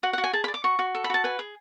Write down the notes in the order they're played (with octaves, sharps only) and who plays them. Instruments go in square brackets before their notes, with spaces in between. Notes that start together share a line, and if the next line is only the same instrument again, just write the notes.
[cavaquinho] F#4 F#5
F#5
F#4
G#5
G#4 A5
B5
D5
D6
F#4 C#6
F#4
A4
B5
F#4 A5
B4 G#5
G#4